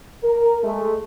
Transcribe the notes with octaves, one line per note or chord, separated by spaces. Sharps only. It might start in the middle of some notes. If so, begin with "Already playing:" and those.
A#4
G#3 A3